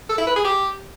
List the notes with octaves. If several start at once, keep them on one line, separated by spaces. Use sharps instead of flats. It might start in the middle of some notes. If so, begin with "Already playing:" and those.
A4
E4
B4
G#4
G4